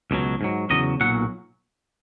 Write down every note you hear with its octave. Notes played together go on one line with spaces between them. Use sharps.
C#2 B2 F#3
G#2 F#3
E2 C#3 F#3 D#5
B1 A#2 F#3 F#5